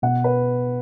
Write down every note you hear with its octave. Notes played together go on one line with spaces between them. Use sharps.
B2 F#5
B4